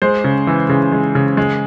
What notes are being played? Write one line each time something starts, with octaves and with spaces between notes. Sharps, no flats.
G#3 C5
C#3
E3
C#3
G#3
C#3
G#3